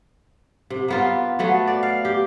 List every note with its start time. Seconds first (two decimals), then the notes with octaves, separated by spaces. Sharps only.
0.70 C3
0.88 A#3 B3 F4
1.39 F#3 A3 B3
1.67 D5
1.83 F5
2.05 G4